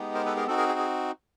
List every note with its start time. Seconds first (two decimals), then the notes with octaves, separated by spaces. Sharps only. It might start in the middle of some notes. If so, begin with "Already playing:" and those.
Already playing: G#3 B3 D#4 G4
0.15 A#4 C5
0.26 A4 B4
0.37 G#4 A#4
0.47 C4 D#4 F#4 A4
0.57 G#4 A#4
0.69 G#4
0.79 G#4